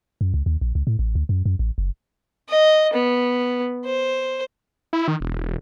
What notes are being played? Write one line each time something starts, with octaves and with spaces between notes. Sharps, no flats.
F#2
C#2
D#2
A#1
C#2
A2
A1
D2
F#2
F#2
A1
F#1
D#5
B3
C5
E4
D#3
E1